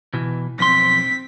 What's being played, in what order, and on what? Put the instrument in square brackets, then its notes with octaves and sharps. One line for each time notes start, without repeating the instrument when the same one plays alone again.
[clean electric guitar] B2 E3
[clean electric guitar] B1 F2 C6 [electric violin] C4 B6